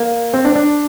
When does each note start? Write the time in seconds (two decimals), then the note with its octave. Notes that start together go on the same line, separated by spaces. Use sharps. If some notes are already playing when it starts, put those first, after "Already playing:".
Already playing: A#3
0.34 C4
0.45 D4
0.56 D4